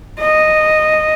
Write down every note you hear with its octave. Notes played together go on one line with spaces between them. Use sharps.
D#5